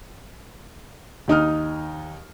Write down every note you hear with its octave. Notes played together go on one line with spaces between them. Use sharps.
D#2 D#4 D#6 F6